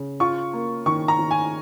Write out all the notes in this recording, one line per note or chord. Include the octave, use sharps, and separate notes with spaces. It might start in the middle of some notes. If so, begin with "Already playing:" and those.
Already playing: C#3
F4 C#6
A#3
D#3 C#6
A#5
D#3
G#5